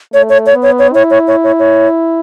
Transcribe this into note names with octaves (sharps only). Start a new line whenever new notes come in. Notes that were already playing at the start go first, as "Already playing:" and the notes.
A3 C#5
C#5
C#5
B3
C#5
C#5
E4 C#5
C#5
C#5
C#5
C#5